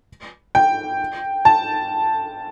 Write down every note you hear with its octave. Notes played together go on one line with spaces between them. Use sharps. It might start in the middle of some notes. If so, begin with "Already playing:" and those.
G5
A5